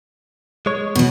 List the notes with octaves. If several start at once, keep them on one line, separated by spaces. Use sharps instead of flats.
G#3 C#5
B2 F#3